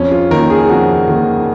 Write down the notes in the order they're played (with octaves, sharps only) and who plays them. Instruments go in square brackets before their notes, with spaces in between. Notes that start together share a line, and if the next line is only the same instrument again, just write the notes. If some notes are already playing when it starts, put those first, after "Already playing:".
Already playing: [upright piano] F2 [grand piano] C#4
[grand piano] F4
[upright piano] D#3 A#3 [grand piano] A#4
[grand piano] G#4
[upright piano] F2 [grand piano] F#4
[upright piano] D#3 A#3